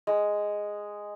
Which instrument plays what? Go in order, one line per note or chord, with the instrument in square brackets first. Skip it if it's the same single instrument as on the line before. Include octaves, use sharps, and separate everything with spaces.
[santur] G#3